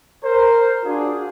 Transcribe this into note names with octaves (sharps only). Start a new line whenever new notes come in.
A#4 C5
D4 F4 F#4 G#4